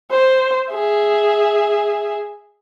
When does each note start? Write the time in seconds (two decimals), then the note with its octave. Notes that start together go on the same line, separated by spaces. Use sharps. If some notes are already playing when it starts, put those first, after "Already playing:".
0.11 C5
0.71 G#4 E5